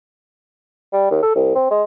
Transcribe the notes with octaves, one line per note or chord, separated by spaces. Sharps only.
G3
D#2
A4
C2
C4
G#3